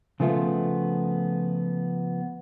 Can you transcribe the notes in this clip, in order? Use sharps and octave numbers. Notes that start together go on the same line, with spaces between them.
C#3 F3 A3 B3 F4